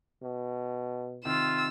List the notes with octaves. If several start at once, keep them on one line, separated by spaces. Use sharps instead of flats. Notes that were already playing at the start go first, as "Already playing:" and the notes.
B2
C3 D#3 F4 E6